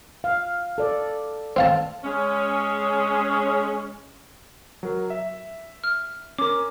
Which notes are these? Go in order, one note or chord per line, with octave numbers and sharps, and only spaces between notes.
F5
A4 D5
C4 F5 A5
G#3 C#4
F#3 A#4
E5
F6
C#4 A#4 D6